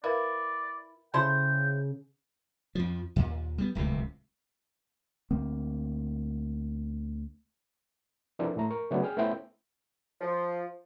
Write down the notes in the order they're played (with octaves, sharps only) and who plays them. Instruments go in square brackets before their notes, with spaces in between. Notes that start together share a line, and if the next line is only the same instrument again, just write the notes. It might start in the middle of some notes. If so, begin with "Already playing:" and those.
[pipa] E4 [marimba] A#4 B4 F5 [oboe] D5
[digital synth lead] C#3 [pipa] E4 A4 C5 [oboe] G5
[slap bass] F2 F3
D#2 A#2
G3 B3
D1 C#2 A2 C3
[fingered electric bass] D2 A#3 C4
[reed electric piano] E3 F3 C4 D4 A4 A#4
A2 A3 A#5
A#4 C#6
C#3 F#3 A3 B3 D4
G#4 G5 F6
A3 B3 C#4 E4 C5 G5
[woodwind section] F3